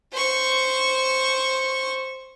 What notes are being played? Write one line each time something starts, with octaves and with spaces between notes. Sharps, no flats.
C5 C#6